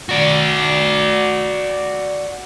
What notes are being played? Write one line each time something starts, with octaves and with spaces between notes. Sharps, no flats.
F#4 D5